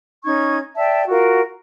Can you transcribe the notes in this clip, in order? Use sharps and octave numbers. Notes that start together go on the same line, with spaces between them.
C#4 D#4 C#6 G#6
D5 E5 G5 A5
F4 F#4 A#4